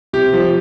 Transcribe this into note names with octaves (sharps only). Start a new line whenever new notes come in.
C3 G4
F3